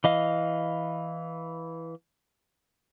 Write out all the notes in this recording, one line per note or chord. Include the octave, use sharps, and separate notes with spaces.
E3 D#5 F5